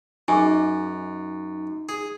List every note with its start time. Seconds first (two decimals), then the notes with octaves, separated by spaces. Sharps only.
0.28 F#2 D#4 G#4 G#5
1.89 G#4